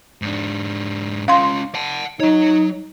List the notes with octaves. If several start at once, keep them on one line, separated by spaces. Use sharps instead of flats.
G#2 D4
C#4 F4 F5 C6
F#5 A5
F#3 D#4 C#5